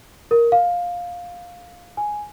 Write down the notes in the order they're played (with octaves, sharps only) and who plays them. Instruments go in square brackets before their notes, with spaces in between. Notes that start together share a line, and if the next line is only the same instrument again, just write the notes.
[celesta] A#4
F5
G#5